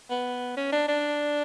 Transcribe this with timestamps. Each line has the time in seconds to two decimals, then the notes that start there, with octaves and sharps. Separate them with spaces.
0.10 B3
0.57 C#4
0.72 D4
0.88 D4